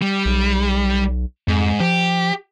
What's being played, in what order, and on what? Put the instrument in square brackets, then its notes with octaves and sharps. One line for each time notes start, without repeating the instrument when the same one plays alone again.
[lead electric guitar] G3
[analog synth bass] B1
[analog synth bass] F2 [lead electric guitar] G#2
[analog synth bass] F3 [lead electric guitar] G4